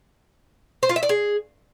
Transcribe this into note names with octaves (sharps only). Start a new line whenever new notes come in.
C5
F4
E5
D5
G#4